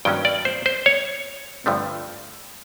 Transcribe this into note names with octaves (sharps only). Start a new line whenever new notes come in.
G2 D#3 F#3 A#3 C#4 G5
D5
C5
C5
C#5
G2 D3 F3 A3